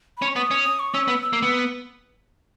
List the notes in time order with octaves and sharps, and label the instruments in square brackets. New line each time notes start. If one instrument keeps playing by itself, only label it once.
[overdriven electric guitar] C#4 [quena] B5
[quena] C#6
[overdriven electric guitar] B3 [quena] D#6
[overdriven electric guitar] C#4
[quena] D#6
C#6
[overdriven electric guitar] C#4 [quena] E6
[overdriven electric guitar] B3
[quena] E6
[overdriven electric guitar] A#3
B3